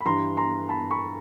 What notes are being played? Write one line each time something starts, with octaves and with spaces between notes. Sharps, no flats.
B5
G2 E3 G3 A#5 C6
A#5 C6
A5 B5
B5 C#6